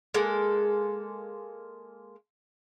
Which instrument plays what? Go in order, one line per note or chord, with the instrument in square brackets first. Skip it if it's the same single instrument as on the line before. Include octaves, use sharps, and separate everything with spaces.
[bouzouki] G#3 A#3 A4